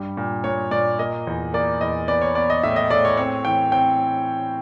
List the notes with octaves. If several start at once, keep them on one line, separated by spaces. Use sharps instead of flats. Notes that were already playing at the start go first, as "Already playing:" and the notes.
Already playing: G2 G3
A#2
A#2 C#5
A#2 D5
A#3 D#5
E2
A#3 D5
E2 D#5
B3 D5
C#5
B3 D5
D#5
A2 E5
D#5
A2 D5
C#5
C4 C#5
E3 G5
C4 G5